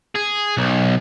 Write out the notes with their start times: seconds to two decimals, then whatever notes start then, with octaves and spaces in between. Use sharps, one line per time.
0.15 G#4
0.57 B1